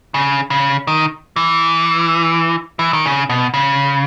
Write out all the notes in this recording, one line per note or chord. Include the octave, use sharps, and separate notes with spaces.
C#3
C#3
D#3
E3
E3
D#3
C#3
B2
C#3